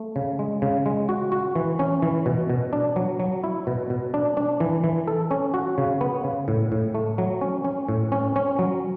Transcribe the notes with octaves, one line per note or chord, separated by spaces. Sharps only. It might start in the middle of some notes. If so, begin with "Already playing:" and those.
Already playing: A3
C#3
G#3
C#3
G#3
F#4
F#4
E3
C#4
E3
B2
B2
D4
F#3
F#3
E4
B2
B2
D4
D4
E3
E3
A4
C#4
F#4
C#3
B3
C#3
A2
A2
A3
F#3
C#4
C#4
A2
C#4
C#4
F#3